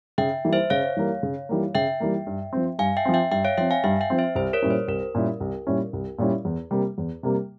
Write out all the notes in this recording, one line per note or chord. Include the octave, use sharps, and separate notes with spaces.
C#3 E5 G5
E3 G3 A#3
C5 E5
C#3 C#5 F5
E3 G3 A#3
C#3
E3 G3 A#3
C#3 E5 G5
E3 G3 A#3
G2
F3 C4
G2 F5 G#5
E5 G5
F3 C4
E5 G5
G2 E5 G5
C#5 F5
F3 C4 E5 G5
F5 G#5
G2 E5 G5
E5 G5
F3 C4
C5 E5
C2 C5
A#4 C#5
A#2 G3 C#4 E4
C5
C2 A#4
A#2 G3 C#4 E4
C2
A#2 G3 C#4 E4
C2
A#2 G3 C#4 E4
E2
C3 G3 A#3
E2
C3 G3 A#3